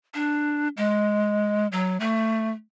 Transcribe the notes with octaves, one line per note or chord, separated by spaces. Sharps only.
D4
G#3
F#3
A3